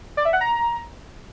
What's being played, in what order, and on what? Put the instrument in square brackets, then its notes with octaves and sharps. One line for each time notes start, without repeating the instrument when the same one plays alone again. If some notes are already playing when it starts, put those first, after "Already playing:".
[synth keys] D5
E5
F#5
A#5